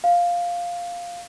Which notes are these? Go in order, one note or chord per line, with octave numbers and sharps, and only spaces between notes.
F5